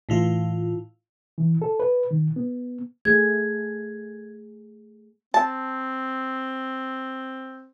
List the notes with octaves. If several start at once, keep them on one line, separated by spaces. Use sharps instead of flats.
A2 E3 F4
E3
A4
B4
D#3
B3
A3 G#4 G#6
C4 A5